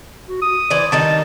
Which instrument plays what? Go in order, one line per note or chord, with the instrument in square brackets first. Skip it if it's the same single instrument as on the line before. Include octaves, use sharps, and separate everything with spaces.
[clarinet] F#4
D#6
[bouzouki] E3 C5 D5
[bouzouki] D#3 G3 D#4 [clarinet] A5